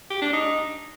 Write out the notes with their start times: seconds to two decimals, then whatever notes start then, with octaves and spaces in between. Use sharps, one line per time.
0.10 G4
0.22 D4
0.33 D#4